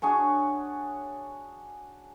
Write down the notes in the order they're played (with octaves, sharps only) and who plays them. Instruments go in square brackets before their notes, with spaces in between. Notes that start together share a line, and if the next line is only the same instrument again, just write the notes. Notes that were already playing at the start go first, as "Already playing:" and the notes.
[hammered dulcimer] D4 F#4 G#4 C#5